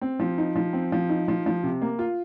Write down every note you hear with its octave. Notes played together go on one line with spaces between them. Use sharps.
C4
F3
D#4
F3
C4
F3
D#4
F3
F3
C3
A#3
F4